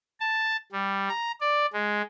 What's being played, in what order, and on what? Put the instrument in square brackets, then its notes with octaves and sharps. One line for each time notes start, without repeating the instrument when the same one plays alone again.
[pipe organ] A5
G3
A#5
D5
G#3